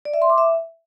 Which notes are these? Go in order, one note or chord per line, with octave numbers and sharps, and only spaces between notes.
D5
E5
C6
D6
E5